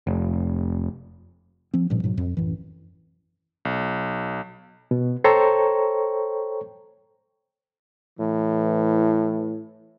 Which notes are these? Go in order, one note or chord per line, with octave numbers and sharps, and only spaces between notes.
F1
F3 C4
A1 G2 A#2 F3
G#2 B2 F#3
F2
A1 F#2 E3
B1
B2
A4 C5 C#5 G5 A#5 C#6
A2 E3